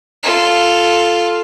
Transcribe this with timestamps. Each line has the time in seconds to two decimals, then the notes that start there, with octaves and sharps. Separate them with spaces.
0.23 F4 A4